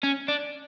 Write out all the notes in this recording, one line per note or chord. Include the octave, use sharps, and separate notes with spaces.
C#4
D4